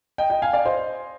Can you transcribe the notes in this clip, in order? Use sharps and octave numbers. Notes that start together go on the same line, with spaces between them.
D#5 G5
D#5 G5
F5 G#5
D5 F5
C5 D#5